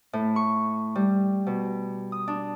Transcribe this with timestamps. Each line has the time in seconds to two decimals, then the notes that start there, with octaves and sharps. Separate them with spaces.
0.13 A2
0.36 C#6
0.96 G3
1.47 B2
2.12 D#6
2.28 D4